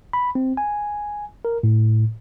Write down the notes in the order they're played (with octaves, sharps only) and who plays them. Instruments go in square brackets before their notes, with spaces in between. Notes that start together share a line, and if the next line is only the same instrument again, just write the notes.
[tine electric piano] B5
C4
G#5
A#4
A2